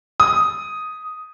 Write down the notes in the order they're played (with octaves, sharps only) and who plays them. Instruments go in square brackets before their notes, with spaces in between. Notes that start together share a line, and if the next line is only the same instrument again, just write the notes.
[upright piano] D#6